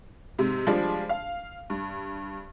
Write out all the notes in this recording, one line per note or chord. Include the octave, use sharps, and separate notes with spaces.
G#2 C3
F3 G3 G#3 D4
F5
G2